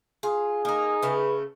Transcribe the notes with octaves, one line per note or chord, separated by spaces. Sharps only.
F4 G#4
A#3 D#4 A#4
C#3 A3 B4